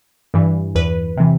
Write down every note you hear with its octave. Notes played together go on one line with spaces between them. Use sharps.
G2 E3
E2 B4
C3 E3